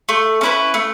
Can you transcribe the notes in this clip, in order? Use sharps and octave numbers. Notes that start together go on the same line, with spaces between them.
A3
C#4 E4 B4
A3